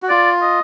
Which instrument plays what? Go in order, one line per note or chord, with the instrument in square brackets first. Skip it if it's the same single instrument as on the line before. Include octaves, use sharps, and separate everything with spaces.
[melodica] F#4
[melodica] F4 [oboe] D5
[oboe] D#5